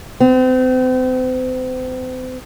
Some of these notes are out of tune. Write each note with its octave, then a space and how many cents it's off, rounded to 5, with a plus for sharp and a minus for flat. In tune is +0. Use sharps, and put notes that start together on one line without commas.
C4 -40